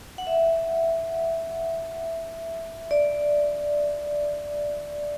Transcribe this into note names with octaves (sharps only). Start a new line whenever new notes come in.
F#5
E5
D5